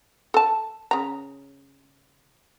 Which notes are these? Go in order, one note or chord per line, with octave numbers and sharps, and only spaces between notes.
A4 A5
C#3 A#5